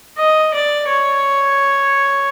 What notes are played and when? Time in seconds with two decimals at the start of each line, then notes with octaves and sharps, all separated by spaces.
0.17 D#5
0.53 D5
0.88 C#5